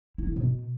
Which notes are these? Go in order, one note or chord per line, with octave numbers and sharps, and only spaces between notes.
E4
D3
B2